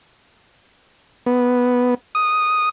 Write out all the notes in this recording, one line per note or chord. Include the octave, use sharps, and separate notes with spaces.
B3
D#6